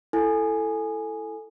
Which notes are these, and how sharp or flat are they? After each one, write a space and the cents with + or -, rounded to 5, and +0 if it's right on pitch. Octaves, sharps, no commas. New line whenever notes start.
E4 +10 A4 +0 G#5 +0